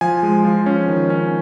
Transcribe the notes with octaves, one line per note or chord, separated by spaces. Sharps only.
F3 G#5
G#3
F3
C#4
D#3
C#4